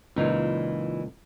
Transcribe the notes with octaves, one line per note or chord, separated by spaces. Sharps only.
C#2 A#2 E3 D#4 F4